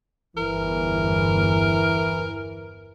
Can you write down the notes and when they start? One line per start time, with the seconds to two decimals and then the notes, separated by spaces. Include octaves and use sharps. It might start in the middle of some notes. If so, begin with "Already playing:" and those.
0.37 G1 E2 E3 A#4